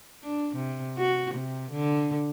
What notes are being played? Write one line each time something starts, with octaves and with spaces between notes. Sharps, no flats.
D4
C3
F#4
C3
D3